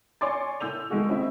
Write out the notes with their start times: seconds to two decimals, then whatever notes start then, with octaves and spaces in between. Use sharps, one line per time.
0.21 C#5 D5 G#5 C6 D6 A6
0.61 A2 E6 G6 F7
0.90 D#3 G#3 A3 F#4 G#4
1.09 C4 C#4 E4 D#5 E5